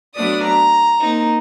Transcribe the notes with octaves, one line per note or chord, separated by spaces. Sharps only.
F#3 A3 B3 D4 D5 D#6
A#5
A#3 C4 D#4